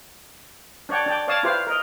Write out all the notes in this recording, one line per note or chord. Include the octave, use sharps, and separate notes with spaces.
D4 C#5 D5 F#5 G5
D4 D5 G5
C#5 D5 F5 A5 D#6
E4 F4 G4 B4 C5 F5
A#4 D#5